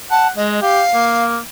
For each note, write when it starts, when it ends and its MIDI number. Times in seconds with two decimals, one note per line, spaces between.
0.11 0.29 78
0.11 0.27 81
0.37 0.60 56
0.37 0.60 75
0.61 0.82 67
0.61 1.24 77
0.94 1.38 58